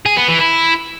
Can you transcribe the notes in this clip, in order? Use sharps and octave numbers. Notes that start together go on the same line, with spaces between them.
G#4
B3
E3
E4